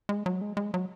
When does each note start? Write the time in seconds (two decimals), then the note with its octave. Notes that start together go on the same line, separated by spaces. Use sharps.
0.09 G#3
0.26 F#3
0.41 G#3
0.57 G#3
0.74 F#3